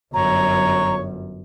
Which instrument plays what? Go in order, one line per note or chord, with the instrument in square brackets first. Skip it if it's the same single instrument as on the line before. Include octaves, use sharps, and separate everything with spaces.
[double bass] G1 F#2 [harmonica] C#5 [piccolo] A#5